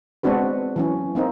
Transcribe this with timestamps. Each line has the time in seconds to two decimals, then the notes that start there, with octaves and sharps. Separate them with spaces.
0.23 G#3 B3 C4 D4 F#4 B4
0.76 E3 F#3 C#4
1.15 A#3 C4 D#4